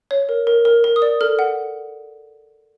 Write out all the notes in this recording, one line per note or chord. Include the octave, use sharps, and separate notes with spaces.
C#5
A#4
A#4
A#4
A#4
D#6
D5
A4 F6
F#5